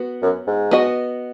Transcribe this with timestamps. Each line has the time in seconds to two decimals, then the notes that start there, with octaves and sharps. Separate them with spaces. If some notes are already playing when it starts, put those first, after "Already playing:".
Already playing: B3 F#4
0.22 F#2
0.47 G#2
0.71 B3 F#4 D#5